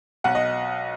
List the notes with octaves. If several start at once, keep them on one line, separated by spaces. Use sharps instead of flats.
B1 F#5
D#5